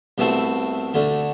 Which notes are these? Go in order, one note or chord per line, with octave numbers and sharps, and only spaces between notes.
C2 B2 A3 C4 E4
D2 D3 A3